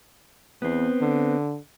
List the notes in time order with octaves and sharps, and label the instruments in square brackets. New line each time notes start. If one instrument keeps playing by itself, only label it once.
[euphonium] E2 [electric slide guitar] B3 C4
[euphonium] D3